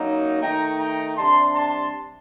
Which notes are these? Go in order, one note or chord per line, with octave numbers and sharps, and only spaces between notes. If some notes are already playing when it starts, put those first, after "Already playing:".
Already playing: F#2 F#3 A#3 D#4
D#3 A3 D#4 G5 A#5
G5 A#5
C3 G3 D4 A5 C6
A5 C6